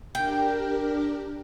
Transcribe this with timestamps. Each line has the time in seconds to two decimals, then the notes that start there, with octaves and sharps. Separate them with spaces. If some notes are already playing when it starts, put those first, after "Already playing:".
0.15 D4 G4 A#4 G5